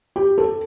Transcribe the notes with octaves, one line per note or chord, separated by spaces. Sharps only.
G4
A4